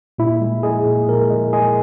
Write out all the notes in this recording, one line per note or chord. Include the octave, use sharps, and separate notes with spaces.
A#2 E4
G#3
G#3 G#4
A#2
A#2 A#4
G#3
G#3 G#4